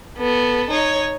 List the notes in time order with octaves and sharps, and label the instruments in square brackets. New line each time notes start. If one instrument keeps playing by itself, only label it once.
[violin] B3 A4
D#4 C#5